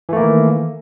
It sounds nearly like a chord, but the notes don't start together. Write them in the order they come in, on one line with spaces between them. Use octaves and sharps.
E3 A3 A#3 D#3